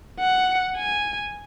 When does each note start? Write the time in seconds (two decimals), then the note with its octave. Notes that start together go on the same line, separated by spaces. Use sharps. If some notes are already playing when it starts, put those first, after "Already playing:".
0.20 F#5
0.77 G#5